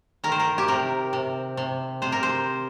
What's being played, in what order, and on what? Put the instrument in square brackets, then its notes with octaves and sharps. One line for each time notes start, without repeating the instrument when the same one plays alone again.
[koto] D#3 A#4
C5
A#4
G4
C3 A#4
C3
C3
C3 C5
A#4
C5